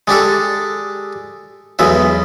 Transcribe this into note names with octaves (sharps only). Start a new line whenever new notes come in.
G#3 D4 G4 A4
B1 E2 G#3 E5